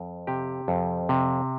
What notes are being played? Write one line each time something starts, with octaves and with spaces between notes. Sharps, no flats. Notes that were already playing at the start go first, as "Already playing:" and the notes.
Already playing: F2
C3 G4
F2
C3